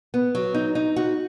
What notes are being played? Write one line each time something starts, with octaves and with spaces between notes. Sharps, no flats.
B3
F#3
D#4
D#4
F#4